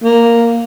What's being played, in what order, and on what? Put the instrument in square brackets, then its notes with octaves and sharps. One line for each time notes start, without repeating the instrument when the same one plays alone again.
[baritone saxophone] A#3